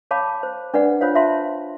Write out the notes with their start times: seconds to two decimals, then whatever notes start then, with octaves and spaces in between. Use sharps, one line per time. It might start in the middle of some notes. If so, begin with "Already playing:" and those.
0.11 C#5 F5 A5 B5 D6
0.43 C5
0.74 D4 B4 D5 F#5
1.01 D4 F4 C5 C#5 F5
1.15 F4 E5 F5 A5 C6